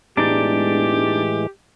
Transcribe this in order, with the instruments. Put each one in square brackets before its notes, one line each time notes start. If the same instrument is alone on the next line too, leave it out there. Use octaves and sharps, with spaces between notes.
[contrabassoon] E1 [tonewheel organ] A2 E3 G#3 [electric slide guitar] D4 D#4 D5 [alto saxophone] G4